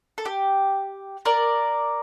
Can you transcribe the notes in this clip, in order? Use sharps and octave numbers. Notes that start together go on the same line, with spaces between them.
A4
G4
A#4 D5